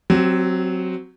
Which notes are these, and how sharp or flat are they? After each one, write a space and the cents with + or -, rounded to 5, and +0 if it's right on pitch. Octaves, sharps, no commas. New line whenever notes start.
F#3 +0 C4 +0 G4 -30